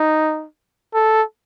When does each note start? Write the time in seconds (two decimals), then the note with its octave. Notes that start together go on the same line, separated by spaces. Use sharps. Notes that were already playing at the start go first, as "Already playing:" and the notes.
Already playing: D#4
0.94 A4